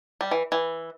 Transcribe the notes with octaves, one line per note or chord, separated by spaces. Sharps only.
G3
E3
E3